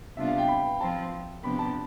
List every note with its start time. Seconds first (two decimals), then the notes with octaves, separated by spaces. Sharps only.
0.17 C3 G3 B3 D4 F4 E5
0.28 F5
0.38 G5
0.48 B5
0.80 F3 C4 F4 A5
1.43 C3 F3 B3 D4 G4 B5
1.59 A5